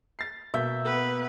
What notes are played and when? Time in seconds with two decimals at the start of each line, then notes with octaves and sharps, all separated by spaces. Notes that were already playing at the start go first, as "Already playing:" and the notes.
0.19 A6 C7
0.54 B2 A#3 E5 G6
0.85 B3 B4